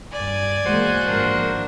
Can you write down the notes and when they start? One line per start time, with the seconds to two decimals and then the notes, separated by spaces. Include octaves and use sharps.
0.12 G2 D5 G#5
0.65 E2 G#3 A#3 F#4 C5
1.07 G#1 F3 A#3 D4 A#4